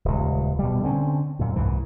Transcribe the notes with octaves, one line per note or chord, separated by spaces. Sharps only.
D#1 C#2
B2 G3
D3 C4 C#4
F#2 A#2
C2 G#2 E3